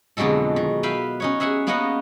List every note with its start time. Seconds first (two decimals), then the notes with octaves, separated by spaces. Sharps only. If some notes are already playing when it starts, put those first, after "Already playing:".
0.17 F2 B2 D3 F#3 G#3 A4
0.56 D#3
0.83 B4 E5 F5 G5 B5
1.20 C#4 D#4 C#5
1.40 G#4 E5 F#5 G#5
1.67 A#3 B3 C#4 D#4 D#5 F#5